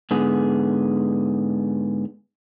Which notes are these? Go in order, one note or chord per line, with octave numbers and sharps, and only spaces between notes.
G#2 D3 B3 G#4